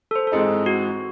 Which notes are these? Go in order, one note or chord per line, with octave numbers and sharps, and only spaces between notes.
A4
C5
A4
G#2 E3 G#3 C4 D#4 G#4
F#4